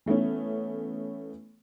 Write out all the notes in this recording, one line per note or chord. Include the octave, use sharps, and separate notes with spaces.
E3 A3 B3 C#4